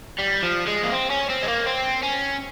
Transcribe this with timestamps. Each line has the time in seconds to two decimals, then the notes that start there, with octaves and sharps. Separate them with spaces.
0.19 G3
0.43 F3
0.67 G#3
0.83 A#3
0.92 C4
1.10 C#4
1.30 C4
1.43 G#3
1.48 A#3
1.66 C4
2.03 C#4